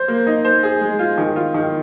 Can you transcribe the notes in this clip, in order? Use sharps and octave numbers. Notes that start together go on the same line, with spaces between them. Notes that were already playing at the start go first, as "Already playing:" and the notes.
Already playing: C5
A#3
D#4
C5
G#4
G#3
F4
D#3
F4
D#3